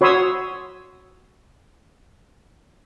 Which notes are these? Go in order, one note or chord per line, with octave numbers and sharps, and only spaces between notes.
F#4 C#5 B5 C6 D#6 E6